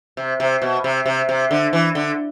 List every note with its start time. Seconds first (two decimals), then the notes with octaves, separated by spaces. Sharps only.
0.17 C3
0.40 C3
0.62 B2
0.84 C3
1.06 C3
1.29 C3
1.51 D3
1.73 E3
1.95 D3